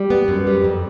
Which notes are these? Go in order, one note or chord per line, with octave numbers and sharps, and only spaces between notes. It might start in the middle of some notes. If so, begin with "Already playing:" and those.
Already playing: G3
B3
F#2
G3
F2